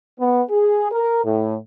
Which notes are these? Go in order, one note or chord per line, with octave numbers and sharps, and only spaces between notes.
B3
G#4
A#4
A2